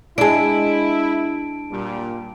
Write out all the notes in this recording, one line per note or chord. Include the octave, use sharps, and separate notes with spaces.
G#3 D4 E4 A5 D7
A#2 G3